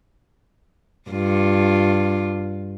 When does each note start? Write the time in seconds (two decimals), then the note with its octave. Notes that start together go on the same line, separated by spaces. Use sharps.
1.10 G2 F4